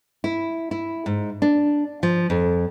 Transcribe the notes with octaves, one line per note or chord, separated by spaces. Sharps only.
E4
E4
G#2
D4
F3
F2